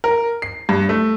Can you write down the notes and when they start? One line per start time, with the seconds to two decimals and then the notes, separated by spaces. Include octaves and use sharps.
0.04 A#4
0.42 C7
0.69 G2
0.89 A3